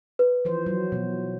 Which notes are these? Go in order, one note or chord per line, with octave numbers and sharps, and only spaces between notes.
B4
E3 F3 C5
F#3
B2